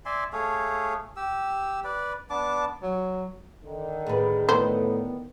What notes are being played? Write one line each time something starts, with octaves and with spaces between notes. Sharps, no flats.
D5 E5 G#5 C6
A3 G#4 C#5 F5
G4 E6
B4 D5
B3 D4 A5 D6
F#3
D3 D#3
A2 G#4 B4
A2 B3 B4 C5